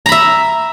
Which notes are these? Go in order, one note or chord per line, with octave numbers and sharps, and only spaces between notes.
E5 A#5 B5